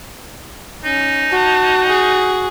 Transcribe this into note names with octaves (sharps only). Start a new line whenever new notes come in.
C#4 D#4
F#4 A5
G#4